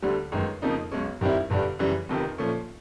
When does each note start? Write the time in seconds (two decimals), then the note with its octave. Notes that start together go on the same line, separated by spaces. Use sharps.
0.02 D2 D3 G3
0.32 G1 F#2 D#3 G#3
0.62 F2 C#3 F3 A#3 D#4
0.92 B1 B2 G#3 C#4
1.21 G2 D#3 G3 C4 E4
1.50 G1 G2 D3 G3
1.79 F#2 C#3 E3 G3
2.09 F1 F2 C3 D#3
2.38 A#2 F3 A3 C#4